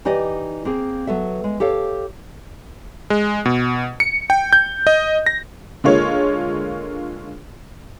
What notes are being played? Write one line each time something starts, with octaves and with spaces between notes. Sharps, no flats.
E3 D#4 G4 D5 D#5
A#3 C4 G#4
F#3 B3 A4 E5
G#3
G4 A4 C#5 F5
G#3
B2
C#7
G5
G6
D#5
A#6
D3 G#3 A#3 F4 C#5